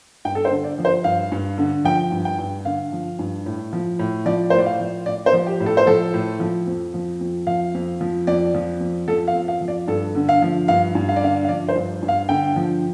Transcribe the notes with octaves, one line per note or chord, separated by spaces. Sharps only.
G2 G5
A4
C5
D3
D5
F3
C5
G2 F5
G2
D3
F3 G5
G2
G5
G2
D3 F5
F3
G2
A2
F3
A2
F3 D5
C5
A2
D5
F5
F3
A2 D5
C5
F3
G4
A2
A4
C5
F3 A4
A2
F3
F2
F3
F2
F3 F5
F2
F3
F2 D5
F3
F2
F3 A4
F5
F2
F5
F3
D5
G2 A4
D3
F5
F3
G2 F5
G2
F5
D5
D3 F5
F5
F3 D5
C5
G2
G2
F5
D3 G5
F3